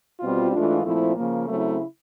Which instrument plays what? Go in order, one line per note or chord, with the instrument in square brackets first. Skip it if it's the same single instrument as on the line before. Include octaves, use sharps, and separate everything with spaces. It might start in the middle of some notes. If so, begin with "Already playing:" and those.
[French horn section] B2 G3 C4 F4
G#2 E3 A3 D4 F4
A#2 F3 A3 C4 E4
C#3 F3 A#3
C#3 F#3 A3 C4 E4